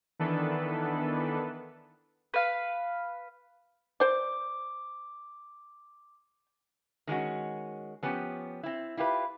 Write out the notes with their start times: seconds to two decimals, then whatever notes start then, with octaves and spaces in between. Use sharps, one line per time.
0.19 D#3 E3 B3 D4 A4 B4
2.34 B4 F5
4.00 C5 D5 D6
7.07 D#3 G#3 C#4 F#4
8.03 F3 B3 C#4 G4
8.63 C4 E4
8.97 E4 F4 G4 B4